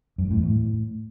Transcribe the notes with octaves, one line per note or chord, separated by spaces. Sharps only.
F#2
G#2
A2
E2
A2